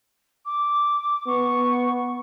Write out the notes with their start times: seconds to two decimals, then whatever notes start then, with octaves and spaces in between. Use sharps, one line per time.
0.46 D6
1.27 B3 C#6